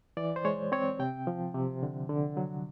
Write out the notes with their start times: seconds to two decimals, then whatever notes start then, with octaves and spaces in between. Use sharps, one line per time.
0.17 E3 D5
0.36 C5
0.45 G#3 C#5
0.72 C4 C#5
0.99 C3 G5
1.27 F3
1.55 C3
1.83 D3
2.09 D3
2.37 F#3